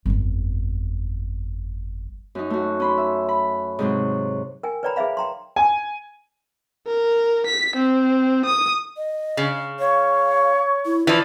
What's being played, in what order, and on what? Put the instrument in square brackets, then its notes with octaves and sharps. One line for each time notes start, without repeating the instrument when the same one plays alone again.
[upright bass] G1 F2
[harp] F#2 D#4
A3 F#4
C#4 B5 C6
E5
B5
G#2 C3 F#3
[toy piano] A#4 G5 G#5
B4 C#5 D5 G5 A#5 B5
G#4 B4 C5 E5 F5 B5
G5 A#5 C6
[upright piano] G#5
[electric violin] A#4
B6
C4
D#6
[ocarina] D#5
[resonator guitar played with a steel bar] C#3
[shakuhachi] C#5 [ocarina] F5
[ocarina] E4
[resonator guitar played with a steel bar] E3 F3 [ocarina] D5